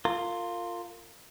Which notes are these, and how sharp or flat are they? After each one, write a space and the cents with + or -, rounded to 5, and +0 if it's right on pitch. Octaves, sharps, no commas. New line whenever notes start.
F4 +0 A#4 -35